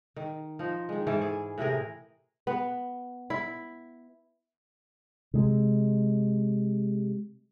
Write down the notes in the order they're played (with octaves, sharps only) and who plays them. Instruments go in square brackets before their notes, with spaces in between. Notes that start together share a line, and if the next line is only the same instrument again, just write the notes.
[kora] D#3
F3 D#4
D#3 G#3
G#2 E3 A4 C#5
G#4
A2 C3 G#4 A#4
B3
E4
[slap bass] C3 G#3